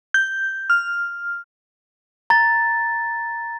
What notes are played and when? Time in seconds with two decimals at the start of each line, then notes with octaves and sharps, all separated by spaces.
0.14 G6
0.70 F6
2.30 A#5 A6